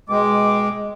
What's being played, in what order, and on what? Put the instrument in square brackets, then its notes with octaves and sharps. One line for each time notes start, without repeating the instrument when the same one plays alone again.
[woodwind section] B2 G5 D6 [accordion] G#3